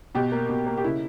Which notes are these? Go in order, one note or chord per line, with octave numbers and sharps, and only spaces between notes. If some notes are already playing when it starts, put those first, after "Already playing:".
B2 G4
A#3
B2
A#3
G4
C#3 E4